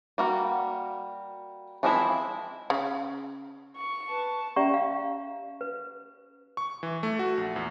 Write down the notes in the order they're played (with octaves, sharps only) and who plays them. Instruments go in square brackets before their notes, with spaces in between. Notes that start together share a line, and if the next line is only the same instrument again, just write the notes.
[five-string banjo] G3 A#3 F#4
E3 F3 G#3 C4 E4
[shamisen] C#3
[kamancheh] C#6
[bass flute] B4 [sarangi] A5
[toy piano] C#4 G4 D5 E5 A#5 C#6
F5
B4
[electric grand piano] C#6
E3
A3
F#4
A#1
E2